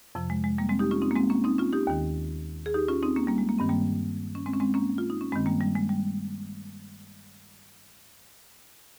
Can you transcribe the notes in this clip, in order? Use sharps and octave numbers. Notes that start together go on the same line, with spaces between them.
F2 C3 F3
G#3
G#3
G3 A#3
G#3 C4
D#4 G4
C#4 F4
C4 D#4
A#3
G#3 C4
A#3 C#4
C4 D#4
C#4 F4
D#4 G4
D#2 D#3
G#4
D#4 G4
C#4 F4
C4 D#4
A#3 C#4
G3 A#3
G#3
A#3
G2 D#3 C4
G3 A#3
C#4
G#3 C4
C#4
G#3 C4
A#3 C#4
F4
D#4
C#4
G2 D#3 G#3 C4
G3 A#3
G3
G#3
G3